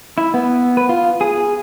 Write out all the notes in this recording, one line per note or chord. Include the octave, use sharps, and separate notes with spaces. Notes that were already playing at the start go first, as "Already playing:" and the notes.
E4
B3
B4
F4
G#4